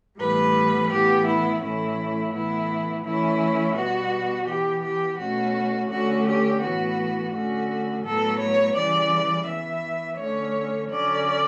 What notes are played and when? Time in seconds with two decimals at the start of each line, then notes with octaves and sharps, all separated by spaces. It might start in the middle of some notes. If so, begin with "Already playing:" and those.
0.19 A2 E3 G3 B3 B4
0.91 A2 E3 B3 G4
1.26 E4
1.61 A2 E3 A3 C#4 E4
2.33 A2 E3 B3 E4
3.04 E3 A3 C#4 E4
3.76 B2 G3 B3 F#4
4.47 E3 B3 G4
4.83 G4
5.19 B2 A3 C#4 F#4
5.89 D3 A3 C#4 F#4
6.26 G4
6.61 A2 E3 B3 F#4
7.33 D3 A3 C#4 F#4
8.04 A2 F#3 B3 A4
8.39 C#5
8.75 C#3 E3 G3 D5
9.46 E3 B3 E5
10.18 D3 A3 C#4 C#5
10.89 D3 F#3 C#4 D5